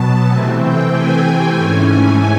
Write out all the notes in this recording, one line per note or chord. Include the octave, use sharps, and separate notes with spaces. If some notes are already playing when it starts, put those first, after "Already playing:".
Already playing: B2 F#3 B3 A5
C3 E3 A3 C4 G#5
G5
G#5
G#2 E3 A3 C#4 G#5